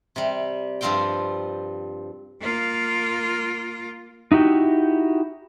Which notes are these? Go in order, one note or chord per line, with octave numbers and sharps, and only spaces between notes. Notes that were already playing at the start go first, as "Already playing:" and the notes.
C3 G3
G2 F3 G3 C4 F5 G5
A#3 F4
D#4 E4 F#4 G4